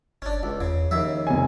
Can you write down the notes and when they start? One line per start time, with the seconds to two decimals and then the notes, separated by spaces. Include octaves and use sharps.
0.22 G1 C#4 D4
0.43 F1 C#2
0.61 E2 C#3
0.91 D#2 C#3 F3 E5
1.27 F1 G#5